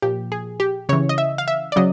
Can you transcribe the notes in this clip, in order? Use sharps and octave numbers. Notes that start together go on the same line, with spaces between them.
A#2 F3 G4
G#4
G4
C#3 E3 C#5
D#5
E5
F5
E5
D5
C#3 F#3 D#5